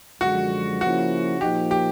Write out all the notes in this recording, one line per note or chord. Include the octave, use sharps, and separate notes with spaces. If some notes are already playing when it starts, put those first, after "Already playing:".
F#2 D3 F3 G#3 F#4
C#3 F3 A#3 C#4 E4 F#4
A#2 F3 A#3 D#4 G4
G4